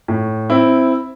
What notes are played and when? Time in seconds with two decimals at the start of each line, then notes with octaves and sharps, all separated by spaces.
0.08 A2
0.50 C4 E4